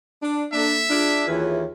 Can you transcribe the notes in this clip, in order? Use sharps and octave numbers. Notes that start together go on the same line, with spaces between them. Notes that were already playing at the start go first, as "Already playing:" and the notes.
D4
A#3 D4 A4 E5
D4 F4 G#4
D#2 E3 F4 G#4 C#5